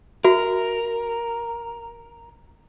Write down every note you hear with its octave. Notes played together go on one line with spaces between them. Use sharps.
F#4 A#4 E5